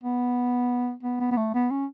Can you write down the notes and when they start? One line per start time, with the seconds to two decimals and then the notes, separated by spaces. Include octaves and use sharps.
0.03 B3
1.03 B3
1.20 B3
1.32 B3
1.37 A3
1.54 B3
1.71 C#4